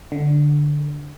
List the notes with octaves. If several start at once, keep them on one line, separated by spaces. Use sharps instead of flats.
D3